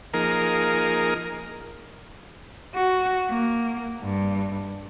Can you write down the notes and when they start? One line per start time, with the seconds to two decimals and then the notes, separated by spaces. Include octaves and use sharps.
0.13 F3 A#3 D#4 G#4 A#4
2.75 F#4
3.29 A#3
4.02 G2